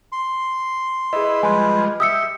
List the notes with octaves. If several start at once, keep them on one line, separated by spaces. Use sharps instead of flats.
C6
E4 G#4 B4 D#5
F3 G3 G#3 B4 G#5 C6
G4 E5 D#6 E6 C#7